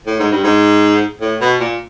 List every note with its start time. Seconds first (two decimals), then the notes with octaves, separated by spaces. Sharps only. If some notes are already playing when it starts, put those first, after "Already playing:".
0.07 A2
0.19 G#2
0.32 G2
0.43 G#2
1.21 A2
1.41 B2
1.60 A#2